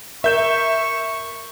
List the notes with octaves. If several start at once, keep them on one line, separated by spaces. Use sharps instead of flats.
A#4 E5 C#6 G6 E7